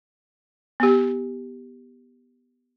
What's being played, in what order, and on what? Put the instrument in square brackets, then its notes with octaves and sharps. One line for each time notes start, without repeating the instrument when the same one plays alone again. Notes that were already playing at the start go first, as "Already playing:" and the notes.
[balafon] B3 G4